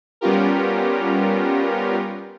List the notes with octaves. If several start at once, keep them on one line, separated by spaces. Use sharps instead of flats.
G3 B3 C#4 F4 G4 A#4